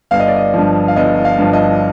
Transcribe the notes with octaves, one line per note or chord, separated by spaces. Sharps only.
G1 F5
D#5
D5
D#5
G2 F3
F5
G1 D#5
F5
G2 F3
D#5